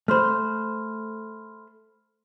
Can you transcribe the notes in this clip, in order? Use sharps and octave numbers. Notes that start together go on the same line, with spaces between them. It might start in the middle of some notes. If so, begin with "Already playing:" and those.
A3 C5 B5 C6 F6